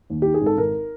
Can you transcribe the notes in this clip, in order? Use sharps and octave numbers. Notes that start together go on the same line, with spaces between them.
D#2
D#3 G4
G#4
G#1
A4
G#1 A#4